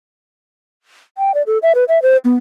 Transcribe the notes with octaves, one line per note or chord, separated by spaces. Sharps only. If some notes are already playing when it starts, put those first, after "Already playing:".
G5
D5
A4
E5
B4
E5
C5
B3